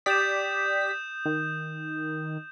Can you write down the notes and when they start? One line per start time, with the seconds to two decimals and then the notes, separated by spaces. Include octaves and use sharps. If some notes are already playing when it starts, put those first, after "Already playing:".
0.06 G4 D5 D#6 G6 B6 E7
1.26 D#3